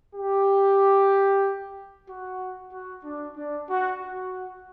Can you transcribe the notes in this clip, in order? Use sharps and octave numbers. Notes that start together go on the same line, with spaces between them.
G4
F#4
F#4
D4
D4
F#4
F#4